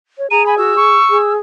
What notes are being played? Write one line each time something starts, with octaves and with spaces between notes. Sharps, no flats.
C#5
G#4 A#5 D#7
G#5 B5
F#4 E6
C#6
G#4